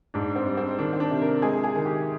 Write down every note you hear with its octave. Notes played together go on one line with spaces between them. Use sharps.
G#2 D4
C4
G3
C4
D#3 D4
C4
D4
C3
A#4
G#3 G#4
G#4
D#3
G4